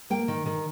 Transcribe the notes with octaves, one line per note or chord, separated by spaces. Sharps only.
A#3 G5
D#3
D#3